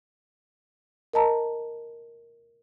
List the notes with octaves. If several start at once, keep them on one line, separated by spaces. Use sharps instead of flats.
A#4 D#5 A5 A#5